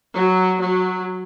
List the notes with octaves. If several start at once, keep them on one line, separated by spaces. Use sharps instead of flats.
F#3
F#3